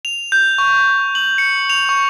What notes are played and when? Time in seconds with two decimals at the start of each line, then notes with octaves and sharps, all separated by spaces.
0.05 F7
0.32 G6
0.58 C#6
1.15 F#7
1.38 C#7
1.70 F7
1.89 C#6